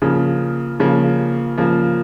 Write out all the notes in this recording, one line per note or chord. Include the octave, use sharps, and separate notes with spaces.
C#3 F3 A#3
C#3 F3 A#3
C#3 F3 A#3